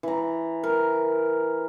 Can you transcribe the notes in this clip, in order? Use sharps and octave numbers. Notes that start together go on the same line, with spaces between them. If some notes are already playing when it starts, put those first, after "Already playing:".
E3 A#5
A#4